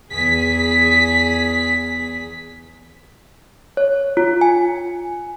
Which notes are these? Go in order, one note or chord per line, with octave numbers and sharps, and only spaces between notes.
E2 G#4 B6
C#5
F4
G#5